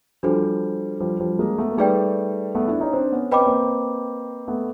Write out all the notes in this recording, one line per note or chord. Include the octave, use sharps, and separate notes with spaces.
F3 G3 D4 F#4 A4 C5
F3 G3
F3 G3
G#3 A#3
A3 B3
A#3
G3 A3 D#4 G#4 B4 D5 G5
A3 B3
D4 E4
C#4 D#4
C4 D4
B3 C#4
C4 B4 D#5 G5 B5 D6
C#4
A#3 C4
A3 B3